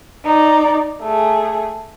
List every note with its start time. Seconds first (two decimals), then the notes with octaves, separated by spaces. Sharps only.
0.25 D#4 D5
1.02 A3 G#4